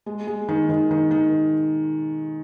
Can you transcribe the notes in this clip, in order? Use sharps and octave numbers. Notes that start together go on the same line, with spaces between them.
G#3
G#3
D#3
D#3
D#3
D#3